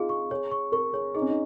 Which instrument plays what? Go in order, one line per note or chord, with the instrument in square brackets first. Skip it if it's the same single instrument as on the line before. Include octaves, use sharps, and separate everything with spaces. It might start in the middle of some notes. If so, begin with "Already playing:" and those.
Already playing: [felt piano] D#4 F4 [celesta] G#4 F5
[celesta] C#6
[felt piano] G#4 [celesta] C#5
[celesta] C#6
[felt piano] A#4 [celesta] C#6
[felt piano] G#4 [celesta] C#5
[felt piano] D#4 [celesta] G#4
[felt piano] C#4
D#4